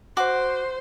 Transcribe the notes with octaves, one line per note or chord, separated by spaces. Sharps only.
F#4 C5 D6